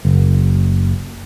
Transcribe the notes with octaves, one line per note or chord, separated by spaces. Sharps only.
F#1